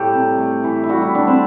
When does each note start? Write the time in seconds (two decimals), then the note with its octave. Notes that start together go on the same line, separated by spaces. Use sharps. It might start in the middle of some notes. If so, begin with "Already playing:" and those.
Already playing: A2 G3 A3 G4 A4
0.13 C3
0.38 A3
0.64 E3
0.84 E4
0.89 G3 F#4
1.02 E4
1.15 G3 D4
1.27 C4